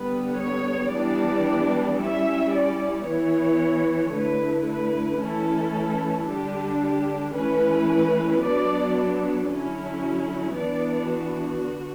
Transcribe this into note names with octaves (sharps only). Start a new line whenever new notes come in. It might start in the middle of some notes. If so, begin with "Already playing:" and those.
Already playing: D3 G3 B3 B4
C#5
E3 G3 B3 D4 D5
G3 C#4 E4 E5
D5
E3 B3 E4 C#5
D3 A3 E4 B4
B4
E3 A3 C#4 E4 A4
D3 G3 D4 G4
G4
E3 A3 C#4 E4 B4
F#3 B3 D4 D5
D3 F#3 C#4 E4
E3 B3 D4 D5
F#4
D3